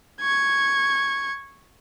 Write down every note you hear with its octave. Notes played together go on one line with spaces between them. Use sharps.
C#6 G#6